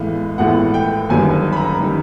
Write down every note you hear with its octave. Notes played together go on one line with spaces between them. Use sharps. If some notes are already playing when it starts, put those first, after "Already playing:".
Already playing: A1 A2 E3 G#3 B3 F5
A1 A2 E3 G#3 B3 F#5
G5
G1 F#2 D#3 G3 G#5
B5
A#5
D#3 G3